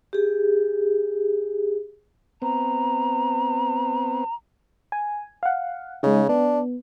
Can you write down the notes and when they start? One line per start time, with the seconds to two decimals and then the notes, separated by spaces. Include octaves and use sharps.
0.13 G4 G#4
2.42 B3 C4 A#5
4.92 G#5
5.43 F5 F#5
6.03 C#3 G#3 D#4
6.29 B3 D4